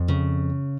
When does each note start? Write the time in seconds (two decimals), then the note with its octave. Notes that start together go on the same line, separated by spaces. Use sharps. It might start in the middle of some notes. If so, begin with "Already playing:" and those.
Already playing: F2
0.08 C#3